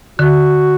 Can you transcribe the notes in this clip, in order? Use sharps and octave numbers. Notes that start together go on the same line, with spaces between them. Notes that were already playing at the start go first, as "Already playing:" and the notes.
D3 F#4